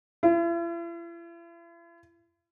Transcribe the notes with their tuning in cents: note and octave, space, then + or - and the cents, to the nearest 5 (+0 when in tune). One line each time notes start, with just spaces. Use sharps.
E4 +45